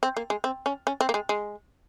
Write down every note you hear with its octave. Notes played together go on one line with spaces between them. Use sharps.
C4
A#3
G#3
C4
C#4
C#4
C4
A#3
G#3
G#3